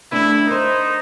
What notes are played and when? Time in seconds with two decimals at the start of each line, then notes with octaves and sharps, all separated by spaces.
0.12 A3 D4 E4 B4
0.47 D#4 A#4 C5